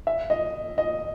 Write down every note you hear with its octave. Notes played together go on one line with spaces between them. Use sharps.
E5
D#5
D#5